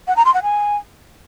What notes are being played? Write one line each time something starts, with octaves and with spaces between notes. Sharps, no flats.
F#5
A#5
C6
F#5
G#5